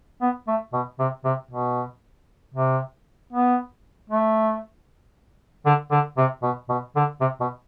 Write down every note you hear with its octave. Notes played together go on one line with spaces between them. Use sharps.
B3
A3
B2
C3
C3
B2
C3
B3
A3
D3
D3
C3
B2
B2
D3
C3
B2